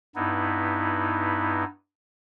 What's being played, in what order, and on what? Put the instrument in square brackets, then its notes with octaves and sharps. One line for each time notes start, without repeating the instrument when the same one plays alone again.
[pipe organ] G2 B3 D#4 E4